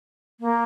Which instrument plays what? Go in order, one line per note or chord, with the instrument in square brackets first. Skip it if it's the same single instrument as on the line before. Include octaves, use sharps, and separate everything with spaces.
[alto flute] A#3